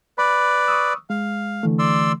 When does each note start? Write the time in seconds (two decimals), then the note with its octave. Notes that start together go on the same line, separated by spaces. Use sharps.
0.18 B4 D5 B5
0.68 C#6 D#6 E6
1.10 G#3 F5
1.63 D3 E3 A3
1.79 D5 C6 E6